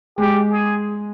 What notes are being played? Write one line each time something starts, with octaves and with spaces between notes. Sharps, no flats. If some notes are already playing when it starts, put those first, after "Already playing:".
G#3 G4
G#4